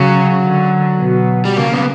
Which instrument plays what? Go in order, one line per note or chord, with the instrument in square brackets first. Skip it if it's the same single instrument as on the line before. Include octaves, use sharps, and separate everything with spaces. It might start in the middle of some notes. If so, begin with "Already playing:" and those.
Already playing: [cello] C#3 [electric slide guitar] F#3
[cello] D3
B2
[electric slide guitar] G3
[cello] C#3 [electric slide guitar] A#3
[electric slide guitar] B3